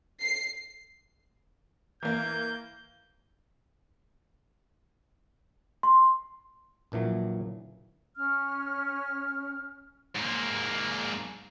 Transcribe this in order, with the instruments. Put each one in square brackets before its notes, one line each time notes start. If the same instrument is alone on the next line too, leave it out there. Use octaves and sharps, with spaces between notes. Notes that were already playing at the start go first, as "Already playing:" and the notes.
[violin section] C7
[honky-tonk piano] E3 A#3 [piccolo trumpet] G6
[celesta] C6
[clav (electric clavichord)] A#1 A#2 E3 F#3
[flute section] C#4 F6
[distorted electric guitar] G#2 A#3